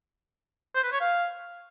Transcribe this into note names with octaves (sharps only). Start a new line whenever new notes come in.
C5
B4
C#5
F5